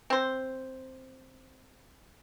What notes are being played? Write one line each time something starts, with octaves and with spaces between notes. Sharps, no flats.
C4 C5